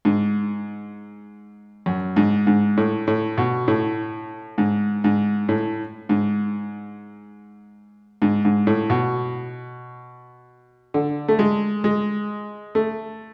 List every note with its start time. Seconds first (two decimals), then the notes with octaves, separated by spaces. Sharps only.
0.05 G#2
1.86 F#2
2.16 G#2
2.47 G#2
2.77 A2
3.08 A2
3.38 B2
3.68 A2
4.58 G#2
5.04 G#2
5.49 A2
6.09 G#2
8.22 G#2
8.45 G#2
8.67 A2
8.90 B2
10.94 D3
11.28 A3
11.39 G#3
11.84 G#3
12.75 A3